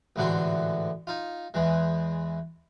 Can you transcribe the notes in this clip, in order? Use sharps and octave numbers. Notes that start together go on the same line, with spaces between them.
A1 G#2 D3 E3 F#4 C6
D#4 F4
E2 E3 G#3